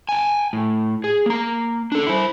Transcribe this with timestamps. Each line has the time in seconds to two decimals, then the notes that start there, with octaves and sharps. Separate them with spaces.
0.09 G5 G#5
0.53 A2
1.04 G#4
1.26 A#3 A#5
1.92 D4 A4
2.07 E4 C5